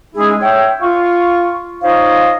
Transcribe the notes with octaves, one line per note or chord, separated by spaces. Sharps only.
G#3 C#4 D#4 E4 G#4
C#5 E5 G5
F4 F5 C#6
D#4 F4 C5 C#5 D#5 F5